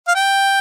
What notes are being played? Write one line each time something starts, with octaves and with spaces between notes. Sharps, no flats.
F5
G5